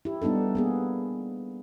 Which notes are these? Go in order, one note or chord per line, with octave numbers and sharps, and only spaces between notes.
E4 G4
G3 B3 D4 D#4 A4
A#3 B3 G#4